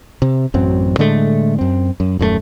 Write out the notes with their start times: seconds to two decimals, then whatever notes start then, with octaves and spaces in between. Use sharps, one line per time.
0.22 C3
0.54 A1 F#2 F#3 C4
0.98 A2 D3 G#3 A3
1.59 F#2 C4
2.00 F#2
2.19 D#1 F#2 F3 A3